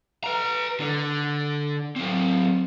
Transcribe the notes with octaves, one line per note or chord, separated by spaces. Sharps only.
B4 A#5
D3
F#3 C4